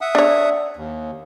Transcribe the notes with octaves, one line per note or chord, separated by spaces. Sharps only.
E5 F#5 D#6
D4 C#5
D#2